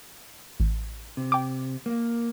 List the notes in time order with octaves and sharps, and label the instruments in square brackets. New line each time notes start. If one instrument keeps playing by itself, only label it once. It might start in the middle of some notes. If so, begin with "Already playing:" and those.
[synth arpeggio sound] A1
[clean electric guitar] C3
[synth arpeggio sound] G5 D6
[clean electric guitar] A#3